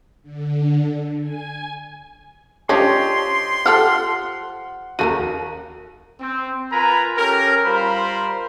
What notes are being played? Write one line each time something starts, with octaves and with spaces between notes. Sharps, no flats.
D3
G#5
F3 C#4 D4 G4 C#5 D#5 C6
F3 G4 A4 F#5 F6
D#2 F#4 A4 A#4 D#7
C4
F4 A#4 B4 G#5 A#5 B5
C#4 G4 A4 A#4
G3 F4 A#4 C5 B5